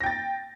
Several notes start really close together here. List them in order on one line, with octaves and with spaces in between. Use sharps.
A#6 G5 A6